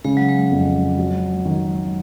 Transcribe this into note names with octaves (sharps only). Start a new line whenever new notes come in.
C#3 G#3
F#3
G#3
F2
F#3
D#3